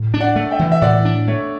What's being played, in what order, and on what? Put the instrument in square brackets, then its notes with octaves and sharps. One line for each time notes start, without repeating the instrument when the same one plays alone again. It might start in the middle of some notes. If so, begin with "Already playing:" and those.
Already playing: [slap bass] A2
D4
[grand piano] D5 F#5
[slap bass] A3
[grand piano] E5 G5
[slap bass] E3
[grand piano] E5
[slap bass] A2 [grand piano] D5 F#5
[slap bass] D4
[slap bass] A3 [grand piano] C#5